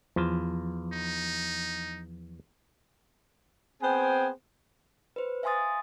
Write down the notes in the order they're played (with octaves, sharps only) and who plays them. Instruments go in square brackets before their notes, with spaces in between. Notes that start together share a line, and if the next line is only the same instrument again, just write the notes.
[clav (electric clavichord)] E2 F4 [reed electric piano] F3
[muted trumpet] D#4
[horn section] B3 C4 G#4 C5 G5 G#5
[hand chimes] B4 C5
E5 F5 G#5 C6 D#6 A6